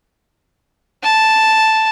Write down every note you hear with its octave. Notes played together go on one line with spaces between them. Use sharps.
A5